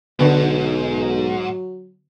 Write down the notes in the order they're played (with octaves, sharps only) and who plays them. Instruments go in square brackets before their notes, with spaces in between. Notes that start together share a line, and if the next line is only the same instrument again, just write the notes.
[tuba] B1 [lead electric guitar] G#2 [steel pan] D3 B3 [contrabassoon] F#3